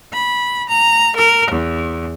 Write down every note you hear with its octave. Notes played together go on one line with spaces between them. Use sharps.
B5
A#5
A#4
E2